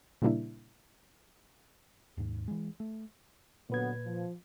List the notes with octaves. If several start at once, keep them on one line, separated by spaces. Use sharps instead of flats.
A#2 C#3 G3 A#3 D4 E4
D#2 G#2
E3 G#3
A3
A#2 D3 F#3 B3 B4 G#6
F3